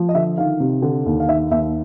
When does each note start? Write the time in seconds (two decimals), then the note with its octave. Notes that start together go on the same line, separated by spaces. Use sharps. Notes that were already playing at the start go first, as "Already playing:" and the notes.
Already playing: F3
0.09 D#5
0.14 D3 E5
0.38 D#3 F5
0.60 C3
0.82 D3
1.06 D#2
1.20 F5
1.28 D#3 E5
1.51 D#2 E5